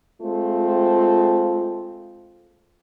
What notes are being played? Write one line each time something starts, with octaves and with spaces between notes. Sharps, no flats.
G#3 A3 C4 F4